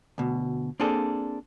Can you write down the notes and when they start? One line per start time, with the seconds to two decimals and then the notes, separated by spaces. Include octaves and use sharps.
0.18 D2 B2
0.80 A#3 C4 D4 G#4 A4